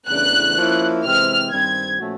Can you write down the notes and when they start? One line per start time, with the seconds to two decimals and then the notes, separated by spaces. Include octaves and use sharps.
0.08 E2 C#3 E3 A3 D4 F#6
0.57 F3 A#3 C#4 E4
1.04 C3 E3 G#3 C4 F6
1.51 G2 D#3 G3 C4 G#6
1.99 A#2 F3 A3 C#4 F#4